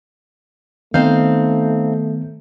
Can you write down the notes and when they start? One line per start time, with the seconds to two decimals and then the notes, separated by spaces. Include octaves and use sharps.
0.94 D#3 A3 B3 C4 D#4 F5 G6